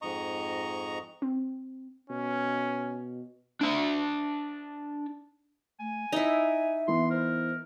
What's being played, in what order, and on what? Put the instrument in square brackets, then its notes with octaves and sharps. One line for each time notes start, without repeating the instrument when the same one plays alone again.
[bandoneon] F2 G#2 D#5 A#5 C#6
[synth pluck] C4
[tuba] B2 [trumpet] C#4
[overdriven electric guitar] D4 E5
[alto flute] A3 [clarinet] G#5
[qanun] D#4 E4 [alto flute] E5
[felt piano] E3 B3 [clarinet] C6
[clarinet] A#4 [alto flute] C5